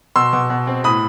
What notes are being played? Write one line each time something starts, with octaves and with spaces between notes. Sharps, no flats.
B2 C6 E6
B2
B2
C4
A2 B5 D#6